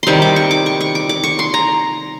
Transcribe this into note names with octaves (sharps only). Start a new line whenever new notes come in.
C3 D#3 G3 C4 C6 C#6
D6
C#6
D6
C#6
C#6
D6
D6
C#6
C6
A#5